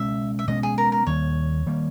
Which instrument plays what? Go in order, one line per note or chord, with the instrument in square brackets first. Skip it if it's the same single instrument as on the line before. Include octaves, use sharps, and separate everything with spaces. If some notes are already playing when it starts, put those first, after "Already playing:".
Already playing: [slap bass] B2 G#3 C#4 [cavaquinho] E5
[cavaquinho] E5
[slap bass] B2 G#3 C#4 [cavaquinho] D#5
[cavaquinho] G#4
A#4
A#4
[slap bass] D#2 D#3 G3 A#3 [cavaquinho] C#5
[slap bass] D#3 G3 A#3